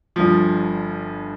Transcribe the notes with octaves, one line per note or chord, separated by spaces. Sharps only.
G1 G2 F3